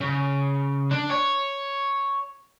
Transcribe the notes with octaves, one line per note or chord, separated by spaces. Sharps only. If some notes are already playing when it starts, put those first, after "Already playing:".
C#3
D4
C#5